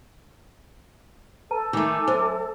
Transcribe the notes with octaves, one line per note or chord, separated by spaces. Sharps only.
A4 B4 A5 A#5
D#3 A3 G#5 D6
F#2 C5